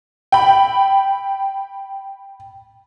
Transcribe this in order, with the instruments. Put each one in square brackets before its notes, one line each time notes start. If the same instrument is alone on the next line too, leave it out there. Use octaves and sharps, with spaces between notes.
[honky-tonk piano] G5 B5